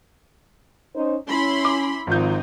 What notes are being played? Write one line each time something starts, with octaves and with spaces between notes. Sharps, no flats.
C#4 D#4 C5
C#4 E4 B5 C6
D6
G#1 F3 C4 D#4 G6